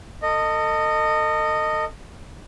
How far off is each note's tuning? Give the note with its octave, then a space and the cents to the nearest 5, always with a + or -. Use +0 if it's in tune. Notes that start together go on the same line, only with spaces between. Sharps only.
A4 +35 D#5 -10